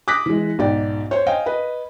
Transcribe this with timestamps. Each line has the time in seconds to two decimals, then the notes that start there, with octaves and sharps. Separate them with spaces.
0.08 D6 D#6 F#6 A#6 B6
0.26 E3 G#3
0.58 B1 G#2 D5 G5
1.11 C5 C#5
1.26 D#5 F5 G5 G#5
1.46 B4 D#5